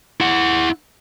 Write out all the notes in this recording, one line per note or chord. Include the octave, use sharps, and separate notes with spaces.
E4 F#5